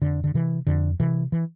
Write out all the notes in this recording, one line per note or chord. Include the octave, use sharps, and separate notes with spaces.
F2 D3
D3
C3 E3
F2 D3
C3 E3
E3